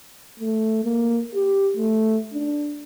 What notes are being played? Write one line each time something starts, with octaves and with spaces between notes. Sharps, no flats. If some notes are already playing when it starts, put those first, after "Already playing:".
A3
A#3
G4
A3
D4